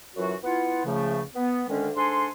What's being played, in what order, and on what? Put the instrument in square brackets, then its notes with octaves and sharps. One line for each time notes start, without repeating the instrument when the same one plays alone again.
[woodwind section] F#2 E3 F#3 F4 F#4
B3 E4 F4 F#5
C#2 C#3 F3 A3
B3
D2 D3 D#3 G#3 C#4
G#2 G#3 D4 A4 G#5 C6